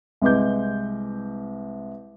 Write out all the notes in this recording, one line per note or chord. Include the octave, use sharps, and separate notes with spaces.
C2 G#3 B4 D6 G6